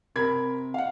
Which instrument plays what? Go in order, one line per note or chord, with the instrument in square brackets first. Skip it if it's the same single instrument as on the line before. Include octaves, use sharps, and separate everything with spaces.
[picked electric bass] C3 [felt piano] A#4 B5 G#6
[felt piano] F5 F#5